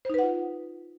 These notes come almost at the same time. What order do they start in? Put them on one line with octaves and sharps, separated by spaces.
C5 D#4 B4 F#5 F4